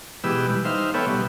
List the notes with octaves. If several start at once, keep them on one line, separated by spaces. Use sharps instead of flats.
B2 E3 G#3 G4 B4 E6
G3
D#4 C5 E5 F5
B3 A4 B4 C#5 E5 G5
B2 G3 B3